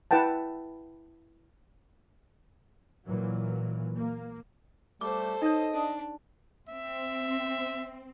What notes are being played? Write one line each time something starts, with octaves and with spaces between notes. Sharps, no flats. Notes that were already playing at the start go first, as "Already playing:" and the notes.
E4 B4 F#5 G5 A5
A#2 E3 F#3
A#3
G3 A3 G4 A4 C5 D6
D#4 C#5 D#5 D#6
D4
C4 E5